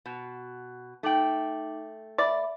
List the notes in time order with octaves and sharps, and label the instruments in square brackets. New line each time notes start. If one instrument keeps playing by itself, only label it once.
[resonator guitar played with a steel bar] B2
[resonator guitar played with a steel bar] A3 G5 [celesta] D#4 D6 F#7
[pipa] D5 [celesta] E5 B5